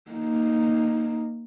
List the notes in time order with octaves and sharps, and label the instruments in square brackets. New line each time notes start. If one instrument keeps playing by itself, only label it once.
[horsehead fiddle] A#3 D#4